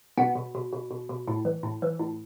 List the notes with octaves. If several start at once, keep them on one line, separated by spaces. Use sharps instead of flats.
B2 B3
B2
B2
B2
B2
B2
A2
E3
A2
E3
A2